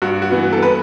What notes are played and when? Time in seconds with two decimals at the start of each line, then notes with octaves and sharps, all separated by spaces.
0.02 G2 F#4
0.22 F#4
0.31 E3 B3
0.53 A4
0.62 B4